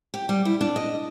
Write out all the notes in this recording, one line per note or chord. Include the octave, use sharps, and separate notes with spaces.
G4
G3
E4
D4
D#5